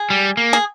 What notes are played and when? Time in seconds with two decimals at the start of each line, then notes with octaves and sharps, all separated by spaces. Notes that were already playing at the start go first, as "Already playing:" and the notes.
Already playing: G#4
0.10 G3
0.37 A#3
0.53 G#4